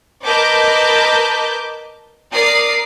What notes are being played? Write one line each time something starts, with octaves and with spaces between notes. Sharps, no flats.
A#4 B4 D#5 A5 D6 G6
A#4 D5 D#6 C7